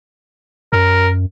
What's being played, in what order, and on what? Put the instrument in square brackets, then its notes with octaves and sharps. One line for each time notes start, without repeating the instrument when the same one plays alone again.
[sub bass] F#2 [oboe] A#4